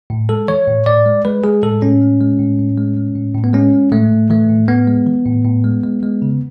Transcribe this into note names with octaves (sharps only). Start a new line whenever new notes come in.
A2
G#3 A4
E3 C#5
A2
A2 D5
G#3
G#3 B4
G#3 G#4
A2 A4
A2 C#4
G#3
G#3
A2
A2
G#3
G#3
A2
A2
B3
G#3 C#4
G#3
A2 A3
A2
E3 A3
A2
A2 B3
G#3
E3
A2
A2
G#3
G#3
G#3
C#3